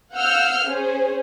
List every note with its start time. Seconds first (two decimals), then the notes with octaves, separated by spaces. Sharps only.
0.15 F5 F#5 E6 F6 G6
0.67 C#4 G#4 C5